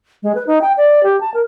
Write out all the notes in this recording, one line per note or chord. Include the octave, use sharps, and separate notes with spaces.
G#3
B4
D#4
G5
D5
G4
A5
A#4